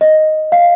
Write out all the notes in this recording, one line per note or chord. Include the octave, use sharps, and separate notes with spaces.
D#5
F5